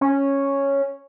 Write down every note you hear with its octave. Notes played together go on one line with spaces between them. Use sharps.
C#4